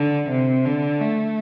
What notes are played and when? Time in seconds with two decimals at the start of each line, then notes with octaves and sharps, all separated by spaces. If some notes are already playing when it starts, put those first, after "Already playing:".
Already playing: D3
0.30 C3
0.65 D3
1.01 A3